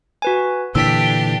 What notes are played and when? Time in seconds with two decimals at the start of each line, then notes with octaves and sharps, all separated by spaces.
0.22 F#4 B4 G#5
0.75 A#2 D3 E3 D4 G4 E6 B6